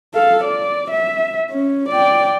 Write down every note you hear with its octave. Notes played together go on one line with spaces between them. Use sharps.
A4 F5
D5
E5
C#4
D5 G5